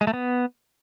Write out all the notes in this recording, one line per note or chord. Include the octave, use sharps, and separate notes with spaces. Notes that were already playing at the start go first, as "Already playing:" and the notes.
G#3
A3
B3